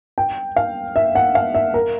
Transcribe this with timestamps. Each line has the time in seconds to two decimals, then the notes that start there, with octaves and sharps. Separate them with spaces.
0.18 G5
0.56 F5
0.96 E5
1.15 F#5
1.35 F5
1.55 E5
1.74 A#4